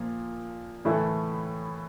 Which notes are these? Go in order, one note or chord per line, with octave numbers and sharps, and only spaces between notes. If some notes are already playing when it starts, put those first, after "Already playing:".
Already playing: A#2 F3 A#3
A2 E3 A3 E4 A4